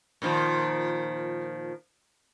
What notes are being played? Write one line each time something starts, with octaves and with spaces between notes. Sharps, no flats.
A#2 D#3 F3